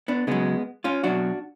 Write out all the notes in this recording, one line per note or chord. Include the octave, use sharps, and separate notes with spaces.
B3 D4
C#3 F#3 G#3 B3
C#4 F4
B2 F#3 D4 F#4